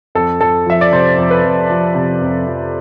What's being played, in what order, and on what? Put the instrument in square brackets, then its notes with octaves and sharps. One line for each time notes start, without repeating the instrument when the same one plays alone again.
[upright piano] F2 A4
F2 A4
F3 E5
D5
C3 C5
F2
B4
F2
F3
C3
F2
F2